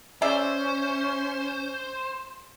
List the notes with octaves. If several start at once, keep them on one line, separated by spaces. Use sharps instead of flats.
C#4 G#4 C5 D5 E5